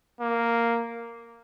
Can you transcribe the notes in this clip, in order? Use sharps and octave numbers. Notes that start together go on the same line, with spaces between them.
A#3